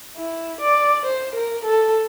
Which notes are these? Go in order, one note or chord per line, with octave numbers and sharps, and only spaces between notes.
E4
D5
C5
A#4
A4